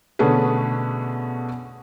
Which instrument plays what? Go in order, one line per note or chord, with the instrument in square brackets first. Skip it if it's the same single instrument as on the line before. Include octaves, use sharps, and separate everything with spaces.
[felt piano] B2 D3 A3 C#4 G#4 B4